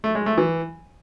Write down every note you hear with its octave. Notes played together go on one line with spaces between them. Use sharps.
A3
G#3
A3
E3